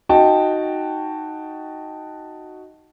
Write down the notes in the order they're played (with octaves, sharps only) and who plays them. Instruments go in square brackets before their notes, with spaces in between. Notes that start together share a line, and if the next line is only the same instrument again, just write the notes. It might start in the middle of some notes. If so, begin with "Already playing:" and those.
[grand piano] D#4 F#4 G5 A5